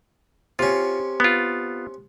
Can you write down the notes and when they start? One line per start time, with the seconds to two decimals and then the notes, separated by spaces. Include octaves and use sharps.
0.59 C3 C#4 F4
1.20 B3 F4